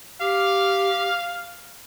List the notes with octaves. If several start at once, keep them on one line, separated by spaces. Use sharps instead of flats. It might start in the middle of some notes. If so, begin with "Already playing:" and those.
G4 F5